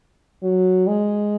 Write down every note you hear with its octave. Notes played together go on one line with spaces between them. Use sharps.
F#3
G#3